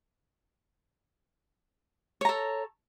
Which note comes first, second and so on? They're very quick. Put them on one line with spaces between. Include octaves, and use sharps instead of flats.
C#5 A#5 A4